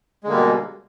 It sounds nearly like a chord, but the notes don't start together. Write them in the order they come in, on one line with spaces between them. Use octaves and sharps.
G#3 D3 A#3 G3 B2